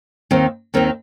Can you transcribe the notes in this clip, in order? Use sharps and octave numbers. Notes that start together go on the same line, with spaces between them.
D#2 D#3 C4 D#4
D#2 D#3 C4 D#4